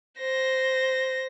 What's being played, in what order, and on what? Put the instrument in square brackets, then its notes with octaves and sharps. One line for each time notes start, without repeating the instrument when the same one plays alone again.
[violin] C5 A#6